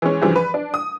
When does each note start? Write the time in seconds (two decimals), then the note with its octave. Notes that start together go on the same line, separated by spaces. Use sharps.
0.02 E3 G#3 C#4
0.22 G2 C#3 E3 F3
0.36 B4
0.54 D4
0.74 D#6